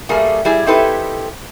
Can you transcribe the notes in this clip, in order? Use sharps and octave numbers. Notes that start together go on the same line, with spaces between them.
G3 A3 A#3 G#4
G3 E4 G#4
C4 D#4 E4 G4 A4 B4